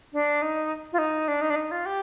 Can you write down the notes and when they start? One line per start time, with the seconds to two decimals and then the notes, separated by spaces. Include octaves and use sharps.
0.13 D4
0.42 D#4
0.93 F4
0.99 D#4
1.28 D4
1.41 D#4
1.50 D4
1.56 D#4
1.71 F4
1.86 G4